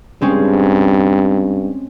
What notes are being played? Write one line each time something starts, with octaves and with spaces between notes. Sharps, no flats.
G2 G#3 C4 C#4